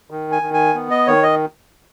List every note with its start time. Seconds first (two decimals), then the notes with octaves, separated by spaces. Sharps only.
0.10 D#3
0.32 G#5
0.42 D#3
0.54 G#5
0.75 B3
0.91 D#5
1.07 D#3 C#5
1.23 D#5